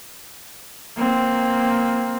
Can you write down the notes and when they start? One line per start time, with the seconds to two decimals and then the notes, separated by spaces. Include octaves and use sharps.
0.97 A#3 C4